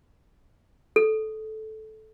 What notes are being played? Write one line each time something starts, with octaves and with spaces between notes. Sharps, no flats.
A4